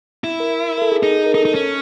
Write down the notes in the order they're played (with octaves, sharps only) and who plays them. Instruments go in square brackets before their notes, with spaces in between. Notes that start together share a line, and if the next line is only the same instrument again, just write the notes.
[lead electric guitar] E4
[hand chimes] A#4
A#4
A4
G#4
[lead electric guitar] D#4 [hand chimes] G#4
[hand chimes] A#4
[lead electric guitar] D#4 [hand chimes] A4
[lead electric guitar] D#4
C#4